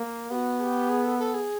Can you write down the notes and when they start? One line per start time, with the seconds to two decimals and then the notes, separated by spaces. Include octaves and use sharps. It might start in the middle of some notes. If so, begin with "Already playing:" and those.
Already playing: A#3
0.30 B3 F#4 G4
0.60 G#4
0.63 G4
0.89 G#4
1.04 A4
1.19 A4
1.34 G#4